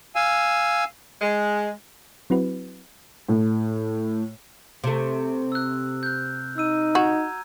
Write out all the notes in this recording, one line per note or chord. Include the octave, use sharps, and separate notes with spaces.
F5 G#5 E6
G#3
F#3 C4 E4 F#4 B4
A2
C3 A3
E6 F#6
F#6 G6
D#4 E6 D#7
F#4 A#5 G#6